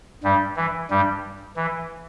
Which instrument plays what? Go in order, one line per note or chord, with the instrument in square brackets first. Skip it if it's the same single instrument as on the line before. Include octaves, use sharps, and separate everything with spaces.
[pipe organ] G2 G3
E3
G2 G3
E3